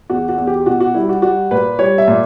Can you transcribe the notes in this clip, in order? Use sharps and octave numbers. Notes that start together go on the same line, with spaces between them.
E2 F#4
F#4
E2
G4
B2 F#4
F#4
G3 E4
F#4
G3 F#4
A#2 B4
G3 C#5
E5
A#2